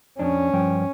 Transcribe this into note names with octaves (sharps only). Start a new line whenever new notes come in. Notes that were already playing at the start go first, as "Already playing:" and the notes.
F2 C#4 D4
G2 F3 G5